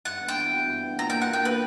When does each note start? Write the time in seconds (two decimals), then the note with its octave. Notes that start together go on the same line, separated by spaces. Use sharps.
0.05 G2 F#5
0.21 B3
0.28 G5
0.37 E3
0.52 F#4
0.67 G2
0.83 B3
0.98 A#2 A#5
1.10 D4 G5
1.22 F#5
1.30 A#3 G5
1.45 A#4 B4